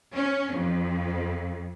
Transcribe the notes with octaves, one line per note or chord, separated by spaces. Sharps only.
C#4
F2